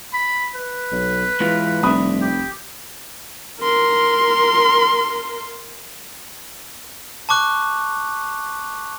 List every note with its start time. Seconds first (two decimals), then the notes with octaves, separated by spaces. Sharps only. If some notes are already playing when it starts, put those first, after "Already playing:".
0.14 B5
0.56 B4
0.92 B1
1.40 E3 G#3 B3 F4
1.83 F1 G3 D4 E5 B5 D#6
2.21 G4
3.60 A#4 C6
7.29 A5 C#6 D6 F#6